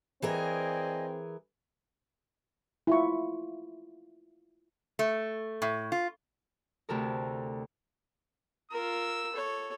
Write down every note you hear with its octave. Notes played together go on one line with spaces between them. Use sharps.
E3 C4 G#4 A#4 D5 D#5 G#5
E4 F4 C#6
A3
A2
F4
D2 C3 A4 A#4
F4 A#4 E6
A4 C#5